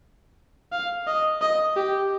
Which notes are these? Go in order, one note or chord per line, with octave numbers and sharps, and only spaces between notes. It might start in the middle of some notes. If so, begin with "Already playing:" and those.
F5
D#5
D#5
G4